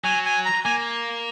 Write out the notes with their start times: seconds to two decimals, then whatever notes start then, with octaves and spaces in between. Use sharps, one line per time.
0.04 F#3 G#5
0.25 G#5
0.45 A#5
0.64 A#3 G#5